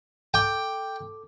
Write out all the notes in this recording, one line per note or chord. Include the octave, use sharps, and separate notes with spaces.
A4 G5 D6